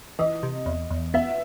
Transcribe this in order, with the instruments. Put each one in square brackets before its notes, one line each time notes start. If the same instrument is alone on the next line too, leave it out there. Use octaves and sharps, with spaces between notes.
[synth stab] E3 [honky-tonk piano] D#5
[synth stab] C3
E2
E2
[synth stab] B3 [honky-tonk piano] E5